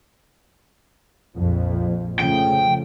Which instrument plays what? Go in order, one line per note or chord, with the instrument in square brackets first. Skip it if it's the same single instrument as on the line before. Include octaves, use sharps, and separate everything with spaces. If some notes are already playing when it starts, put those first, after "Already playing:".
[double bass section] A#1 F2 F3
[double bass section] C#3 F3 A3 [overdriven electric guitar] G5